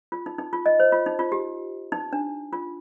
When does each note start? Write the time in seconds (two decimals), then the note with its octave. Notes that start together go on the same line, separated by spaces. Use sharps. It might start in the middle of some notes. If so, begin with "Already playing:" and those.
0.12 F4
0.26 D#4
0.38 D#4
0.53 F4
0.66 D#5
0.80 C5
0.92 F4
1.06 D#4
1.19 F4
1.32 G4
1.92 D#4
2.13 D4
2.53 F4